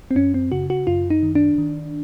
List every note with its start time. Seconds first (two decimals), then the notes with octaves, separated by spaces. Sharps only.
0.11 C4
0.15 F#2 C#4
0.34 C4
0.52 C#3 F#4
0.70 F#4
0.87 F#2 F4
1.10 D#4
1.23 D#3
1.35 D4
1.58 D#3